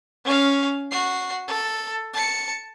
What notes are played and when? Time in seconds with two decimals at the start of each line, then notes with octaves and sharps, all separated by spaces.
0.25 C#4 F5
0.91 F#4 C7
1.48 A4
2.13 A5 C#7